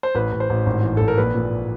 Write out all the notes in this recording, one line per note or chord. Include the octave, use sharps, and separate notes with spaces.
C5
A1 B4
A1
C5
A1
G#1
E3
G#1 A4
A#4
A#1 B4
A#2